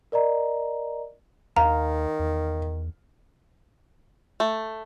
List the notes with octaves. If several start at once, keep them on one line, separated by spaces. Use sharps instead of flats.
A#4 D5 D#5 A#5
D#2 D#3 F5 A#5
E2
A3